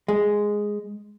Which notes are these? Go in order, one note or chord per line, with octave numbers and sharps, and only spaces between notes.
G#3